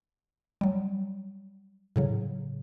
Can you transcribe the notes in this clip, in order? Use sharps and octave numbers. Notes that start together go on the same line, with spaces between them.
F#3 G3
A2 C#3 F#3